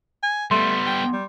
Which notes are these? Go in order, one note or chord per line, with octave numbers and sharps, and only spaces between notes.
G#5
G3 A3 B3 C6
G5
G3